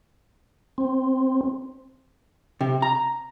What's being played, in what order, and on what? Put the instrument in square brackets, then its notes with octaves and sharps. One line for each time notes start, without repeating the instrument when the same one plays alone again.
[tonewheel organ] C4
[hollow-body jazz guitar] C3
A#5